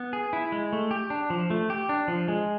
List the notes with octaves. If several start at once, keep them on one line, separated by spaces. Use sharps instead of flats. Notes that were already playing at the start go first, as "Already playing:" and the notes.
Already playing: B3
G#4
E4
G#3
A3
G4
D4
F3
A3
G4
D4
F3
G#3